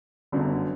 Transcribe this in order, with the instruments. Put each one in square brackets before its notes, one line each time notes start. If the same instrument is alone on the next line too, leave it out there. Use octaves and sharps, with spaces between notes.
[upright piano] G1 F#2 D3 F#3 B3